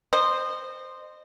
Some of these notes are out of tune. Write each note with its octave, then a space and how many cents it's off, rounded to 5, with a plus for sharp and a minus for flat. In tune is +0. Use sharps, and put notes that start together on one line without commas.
C5 -5 D#5 -30